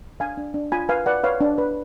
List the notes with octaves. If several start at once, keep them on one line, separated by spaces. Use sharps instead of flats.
D4 F5 G#5
D4
D4
F4 G#5 B5
B4 F5 G#5
B4 D5 F#5
B4 C#5 F5
D4
B4